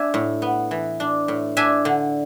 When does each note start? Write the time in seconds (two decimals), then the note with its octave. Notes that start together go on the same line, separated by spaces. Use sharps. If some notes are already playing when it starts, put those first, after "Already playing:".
Already playing: D4 E5 G#5
0.14 A2
0.42 B3
0.71 E3
1.00 D4
1.28 A2
1.57 D4 E5 G#5
1.85 D3